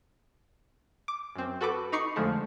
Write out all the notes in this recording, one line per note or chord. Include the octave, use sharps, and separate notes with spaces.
D6
F#2 C4
F#4 A4 B4 D6
D#4 B5 C#6 D6 C7 C#7
F2 D3 F3 G#3 A3